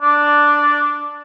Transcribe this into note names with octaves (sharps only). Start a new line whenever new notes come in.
D4